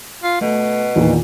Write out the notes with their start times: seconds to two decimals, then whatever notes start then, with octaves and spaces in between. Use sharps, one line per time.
0.23 F4
0.41 B2 A3
0.96 E2 A#2 D#3